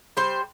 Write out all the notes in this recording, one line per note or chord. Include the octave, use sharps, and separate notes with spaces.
G3 C5